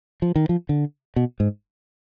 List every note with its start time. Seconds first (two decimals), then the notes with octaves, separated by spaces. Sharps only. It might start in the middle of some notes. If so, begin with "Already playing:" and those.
0.22 F3
0.36 D#3
0.49 F3
0.69 D3
1.16 B2
1.40 G#2